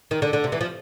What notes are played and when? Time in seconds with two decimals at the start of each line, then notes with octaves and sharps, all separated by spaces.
0.11 D#3
0.22 D3
0.33 D3
0.44 C3
0.52 E3
0.61 F3